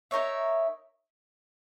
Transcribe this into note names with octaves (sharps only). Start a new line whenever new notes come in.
D#4 A#4 C#5 E5